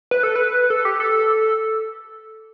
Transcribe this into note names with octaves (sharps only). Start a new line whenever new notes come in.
B4
A4
B4
A4
G4
A4